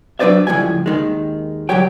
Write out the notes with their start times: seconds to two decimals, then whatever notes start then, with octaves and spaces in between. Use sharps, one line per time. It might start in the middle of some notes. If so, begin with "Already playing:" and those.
0.19 F#3 D4 B4 C5 D5 E5
0.47 C#2 A2 F3 G3 G#5
0.86 D#2 D#3 G#3
1.69 C#2 F#3 G3 G4 C#5 G5